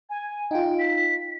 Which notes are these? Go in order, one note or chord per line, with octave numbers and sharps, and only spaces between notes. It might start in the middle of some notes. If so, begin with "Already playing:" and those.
G#5
D#4 F4 G5
B6